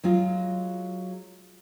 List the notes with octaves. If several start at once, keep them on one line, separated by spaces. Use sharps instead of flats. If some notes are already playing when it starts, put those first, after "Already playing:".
F#3 G#3 F4